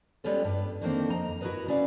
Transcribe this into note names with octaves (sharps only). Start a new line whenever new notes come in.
G3 G#3 B3 C#4 F4 A4
G2
D3 D#3 A#3 C4
F2 D#5 A#5
E4 F#4 A#4 B4 D#5
B3 C#4 D5 E5 F5